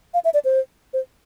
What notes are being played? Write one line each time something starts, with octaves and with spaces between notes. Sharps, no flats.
F5
E5
D5
C5
C5